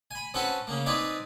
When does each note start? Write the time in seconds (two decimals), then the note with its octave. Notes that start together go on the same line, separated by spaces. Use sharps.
0.11 G#5 B5
0.34 C4 C#4 F#4 A4 B4
0.67 C#3 A#3
0.86 C4 D#4 B4 D5 G#5